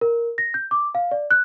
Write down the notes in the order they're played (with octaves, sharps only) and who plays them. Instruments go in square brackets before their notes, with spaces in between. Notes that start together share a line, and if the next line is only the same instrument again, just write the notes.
[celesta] A#4
A#6
G6
D6
F5
D5
F#6